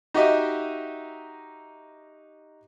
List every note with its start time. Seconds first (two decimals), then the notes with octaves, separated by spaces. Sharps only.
0.14 D#4 F#4 G4 D#5 E5